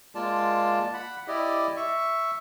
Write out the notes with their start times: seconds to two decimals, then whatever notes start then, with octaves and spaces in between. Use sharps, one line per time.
0.15 G#3 A#3 F4 D5 A5
0.93 F#5 B5
1.28 E4 G4 D5 D#5
1.77 E5 C#6